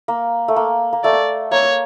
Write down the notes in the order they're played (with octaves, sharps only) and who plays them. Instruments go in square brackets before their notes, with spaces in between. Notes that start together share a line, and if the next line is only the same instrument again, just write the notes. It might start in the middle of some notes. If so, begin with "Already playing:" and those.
[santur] A#3
A3
A#3
A#3
[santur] A3 [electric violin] D5
[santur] A#3 [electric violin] C#5